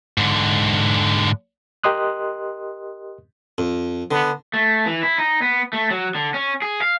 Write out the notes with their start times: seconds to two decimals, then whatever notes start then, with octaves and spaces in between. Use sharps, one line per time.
0.18 G#2 D3
1.84 G4 A#4 D#5 C6 D#6 F#6
3.58 F2
4.11 D3 B3
4.54 A3
4.86 E3
5.03 E4
5.18 D#4
5.42 B3
5.73 A3
5.91 F#3
6.15 D3
6.34 C#4
6.62 G#4
6.82 F5